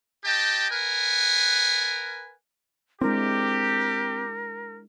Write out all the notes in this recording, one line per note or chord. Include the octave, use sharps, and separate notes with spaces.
G4 D#5 G5 A5
A#4 B4 F#5 G#5
G#3 C4 D4 E4 G4 A#4